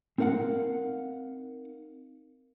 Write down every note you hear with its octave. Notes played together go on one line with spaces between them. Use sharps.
C4 D#4 A#4 F5 F#5